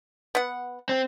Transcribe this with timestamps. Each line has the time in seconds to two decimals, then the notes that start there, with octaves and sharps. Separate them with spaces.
0.35 B3 F#5
0.89 C4